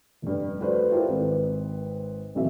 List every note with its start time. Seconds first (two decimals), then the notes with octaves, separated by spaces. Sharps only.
0.22 F1 G2
0.61 F#4 A4 B4 C5 D5
0.91 E4 F4 G4 A4 A#4 C5
1.09 G#1 C4 B4
2.35 D#1 A1 C3 E3 F#3 E5